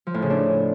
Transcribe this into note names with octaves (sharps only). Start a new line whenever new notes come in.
F3
A2
C#3
D4